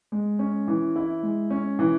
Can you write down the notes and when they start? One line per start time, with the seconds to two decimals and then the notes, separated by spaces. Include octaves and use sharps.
0.12 G#3
0.39 C#4
0.68 E3
0.96 E4
1.23 G#3
1.50 C#4
1.79 E3